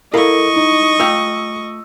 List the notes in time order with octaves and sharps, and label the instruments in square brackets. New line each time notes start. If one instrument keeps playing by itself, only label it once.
[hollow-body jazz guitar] E4 F5 A#5 [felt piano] A4 A#4 [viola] D#5 C#6
[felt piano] D#4
[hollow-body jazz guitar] A3 F4 G5 [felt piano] E6